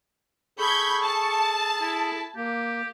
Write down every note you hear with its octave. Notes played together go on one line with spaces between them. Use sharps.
G#4 A4 B5 C#6 G6 G#6
A5
E4
A#3 G4